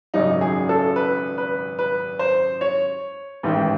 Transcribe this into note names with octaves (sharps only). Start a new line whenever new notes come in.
G#1 F#2 C#3 F#3 D#4
G#4
A4
B4
B4
B4
C5
C#5
A1 G#2 D#3